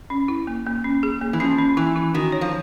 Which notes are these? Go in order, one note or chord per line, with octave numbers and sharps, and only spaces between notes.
C#4
E4
A#3
A#3
C#4
G#4
A#3
E3
F3 C#4
C#4
E3 E4
E4
D#3 F#4
C#5
F3